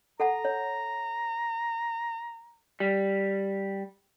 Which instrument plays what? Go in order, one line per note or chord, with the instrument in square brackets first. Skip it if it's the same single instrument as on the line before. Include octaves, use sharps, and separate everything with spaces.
[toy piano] A4 F#5 A5 [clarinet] A#5
[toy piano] C#5
[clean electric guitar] G3